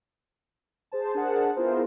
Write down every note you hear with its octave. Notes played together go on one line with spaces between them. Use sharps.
G#4 C5 A5
D4 G#4 A#4 C5 F#5 A5
B3 E4 F4 G#4 A#4 C5